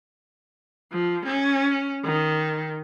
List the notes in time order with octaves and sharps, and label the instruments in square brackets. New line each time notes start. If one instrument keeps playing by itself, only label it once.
[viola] F3
C#4
D#3